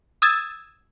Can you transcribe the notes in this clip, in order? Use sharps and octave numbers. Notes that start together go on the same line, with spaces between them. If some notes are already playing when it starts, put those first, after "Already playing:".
D#6 E6 G#6 A6